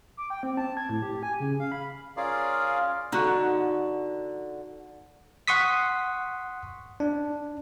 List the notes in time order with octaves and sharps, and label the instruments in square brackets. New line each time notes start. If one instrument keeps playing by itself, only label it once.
[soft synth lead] D6
G5
C4
A5
G#6
A2
G4
G#5
C#3
F5
B5
[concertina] C#4 F4 G#4 A#4 D5 F5
[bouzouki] D3 [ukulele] D#4 F#4
[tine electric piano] F#5 C6 C#6 D#6 B6
D4